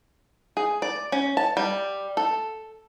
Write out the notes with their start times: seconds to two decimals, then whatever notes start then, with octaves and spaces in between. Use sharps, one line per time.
0.57 G#4
0.82 D5
1.12 C#4
1.37 A5
1.57 G3
2.17 A4